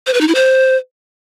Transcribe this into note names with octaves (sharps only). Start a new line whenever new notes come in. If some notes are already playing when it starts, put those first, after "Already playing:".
C5
B4
D#4
E4
C5